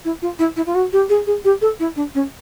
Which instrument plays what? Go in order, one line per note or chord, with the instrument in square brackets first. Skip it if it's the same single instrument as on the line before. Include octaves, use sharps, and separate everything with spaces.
[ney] E4
F4
E4
E4
F4
F#4
G4
G#4
G#4
G4
A4
E4
D4
C#4